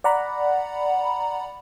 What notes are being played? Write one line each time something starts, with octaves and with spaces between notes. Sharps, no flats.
D5 F#5 A#5 B5